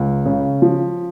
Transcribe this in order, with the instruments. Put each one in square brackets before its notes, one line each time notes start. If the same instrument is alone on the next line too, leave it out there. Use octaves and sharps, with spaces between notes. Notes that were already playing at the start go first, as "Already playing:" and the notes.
Already playing: [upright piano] C#2
C#3
F3